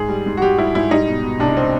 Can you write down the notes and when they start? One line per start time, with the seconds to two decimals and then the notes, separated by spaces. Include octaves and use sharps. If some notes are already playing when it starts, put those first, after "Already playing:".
Already playing: G#2 G#4
0.09 G3
0.26 G#2
0.37 F#4
0.42 G#2 G4
0.58 G3 E4
0.75 G#2 E4
0.90 G3 D#4
1.08 B2
1.23 B2
1.40 C2 D4
1.57 C4